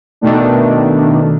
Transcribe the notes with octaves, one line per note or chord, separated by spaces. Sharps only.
B2 D#3 A3 D4